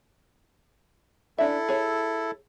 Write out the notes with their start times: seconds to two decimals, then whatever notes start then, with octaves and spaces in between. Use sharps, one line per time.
1.38 C#4 D4 E4 A4 E5
1.69 G#4 C#5